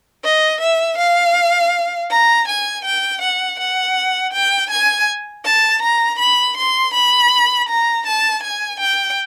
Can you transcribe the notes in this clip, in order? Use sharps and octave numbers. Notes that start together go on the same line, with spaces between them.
D#5
E5
F5
A#5
G#5
G5
F#5
F#5
G5
G#5
A5
A#5
B5
C6
B5
A#5
A5
G#5
G5